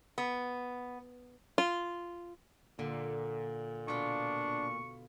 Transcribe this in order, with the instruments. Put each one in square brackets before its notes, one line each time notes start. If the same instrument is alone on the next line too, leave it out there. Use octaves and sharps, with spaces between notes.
[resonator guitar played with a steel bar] B3
[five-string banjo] F4
[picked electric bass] A#2 [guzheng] D3
[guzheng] B2 F4 [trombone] D4 [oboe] C#6